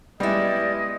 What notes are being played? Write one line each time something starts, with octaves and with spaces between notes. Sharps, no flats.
G3 G#3 B3 E4 D5 D#5